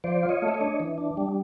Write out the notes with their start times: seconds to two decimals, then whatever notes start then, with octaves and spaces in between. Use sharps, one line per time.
0.04 F3 C5 D5
0.23 F4
0.29 C#5 D#5
0.42 A3
0.48 E5
0.54 C#5 D#5
0.61 D4
0.80 E3
0.98 D4
1.17 G3